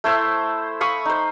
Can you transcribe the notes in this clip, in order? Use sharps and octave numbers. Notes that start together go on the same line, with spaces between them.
A3 E4 C5
F5 B5 C#6 D#6
D#4 C5